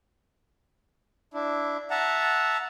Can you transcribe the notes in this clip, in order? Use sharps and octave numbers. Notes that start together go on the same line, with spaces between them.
D4 E4
E5 F#5 A5 A#5